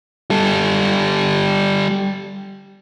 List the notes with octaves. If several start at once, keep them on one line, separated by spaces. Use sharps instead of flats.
G3 A4